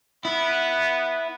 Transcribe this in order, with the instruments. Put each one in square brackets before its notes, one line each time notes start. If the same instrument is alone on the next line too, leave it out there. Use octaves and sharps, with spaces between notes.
[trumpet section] B3 [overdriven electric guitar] E4